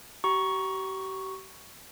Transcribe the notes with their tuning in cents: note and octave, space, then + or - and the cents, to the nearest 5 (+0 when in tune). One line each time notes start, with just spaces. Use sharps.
G4 -40 A#5 +25 C#6 +0